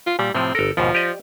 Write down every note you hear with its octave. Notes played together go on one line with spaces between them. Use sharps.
F4
A#2 G3
A2 C3 F3 C4
G1 A4 A#4
D#2 G#2 B2 F3
G4 D5 D#5